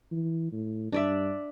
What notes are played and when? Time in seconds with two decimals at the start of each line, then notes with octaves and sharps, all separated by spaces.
0.11 E3
0.52 A2
0.92 G2 D4 D5 E5